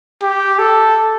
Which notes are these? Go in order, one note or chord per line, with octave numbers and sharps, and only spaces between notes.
G4
A4